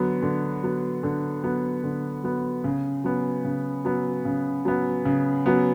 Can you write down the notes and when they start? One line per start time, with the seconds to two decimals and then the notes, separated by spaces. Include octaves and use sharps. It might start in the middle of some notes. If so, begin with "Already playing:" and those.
Already playing: D3 F#3 B3
0.22 D3
0.63 F#3 B3
1.03 D3
1.44 F#3 B3
1.84 D3
2.23 F#3 B3
2.64 C#3
3.04 F#3 B3
3.44 C#3
3.85 F#3 B3
4.25 C#3
4.65 F#3 B3
5.05 C#3
5.46 F#3 B3